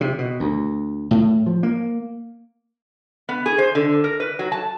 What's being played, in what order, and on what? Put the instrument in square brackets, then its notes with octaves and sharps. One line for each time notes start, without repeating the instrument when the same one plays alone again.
[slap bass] C3
B2
D2
A2
F3
A#3
[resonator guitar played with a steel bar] B3
G#4
C5
D3
A#4
B4
F#3
A5